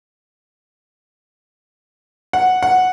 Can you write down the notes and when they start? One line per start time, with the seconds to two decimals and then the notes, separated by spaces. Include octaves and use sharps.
2.33 F#5
2.63 F#5